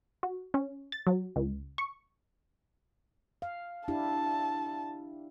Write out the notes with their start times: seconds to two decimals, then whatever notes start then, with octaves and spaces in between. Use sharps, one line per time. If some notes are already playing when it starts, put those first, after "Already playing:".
0.23 F#4
0.54 C#4
0.92 A6
1.07 F#3
1.36 C#2
1.78 C#6
3.42 F5
3.88 D4 E4 G4 A5